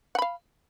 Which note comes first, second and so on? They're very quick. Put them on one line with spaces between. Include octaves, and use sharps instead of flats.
F#5 B5 F5